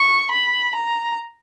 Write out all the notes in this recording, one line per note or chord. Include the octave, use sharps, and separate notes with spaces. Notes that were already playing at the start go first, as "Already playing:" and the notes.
Already playing: C#6
B5
A#5